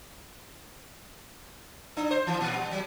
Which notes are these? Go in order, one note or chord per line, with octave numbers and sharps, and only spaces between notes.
D4
C5
E3
A#2
G3
F#3